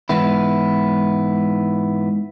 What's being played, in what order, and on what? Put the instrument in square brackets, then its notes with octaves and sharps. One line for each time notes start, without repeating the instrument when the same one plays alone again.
[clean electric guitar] G#2 E3 B3 E4